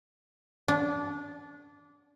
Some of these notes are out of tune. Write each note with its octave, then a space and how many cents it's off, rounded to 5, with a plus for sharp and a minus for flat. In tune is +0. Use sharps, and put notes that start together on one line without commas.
D4 -20